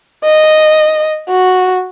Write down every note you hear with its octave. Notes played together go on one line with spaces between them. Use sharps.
D#5
F#4